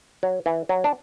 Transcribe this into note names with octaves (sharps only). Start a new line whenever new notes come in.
F#3
E3
F#3
D4